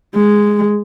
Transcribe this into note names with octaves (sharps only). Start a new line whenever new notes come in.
G#3